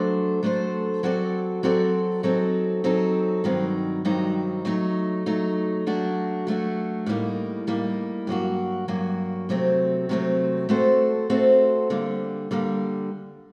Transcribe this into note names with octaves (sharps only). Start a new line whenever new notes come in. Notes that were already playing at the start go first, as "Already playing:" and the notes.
Already playing: F#3 A3 D4 A4 C5
F#3 A3 D4 A4 C5
F#3 C4 F#4 A4 D5
F#3 C4 F#4 A4 D5
F#3 C4 D#4 A4
F#3 C4 D#4 A4
G2 D#3 F#3 C4 D#4
G2 D#3 F#3 C4 D#4
F#3 A3 D#4
F#3 A3 D#4
F#3 A3 D4 F#4
F#3 A3 D4 F#4
A2 G3 A#3 D#4
A2 G3 A#3 D#4
G2 F#3 A#3 F#4
G2 F#3 A#3 F#4
C3 F#3 A3 C4
C3 F#3 A3 C4
A3 C4 F#4 A4 C5
A3 C4 F#4 A4 C5
D3 G3 A#3
D3 G3 A#3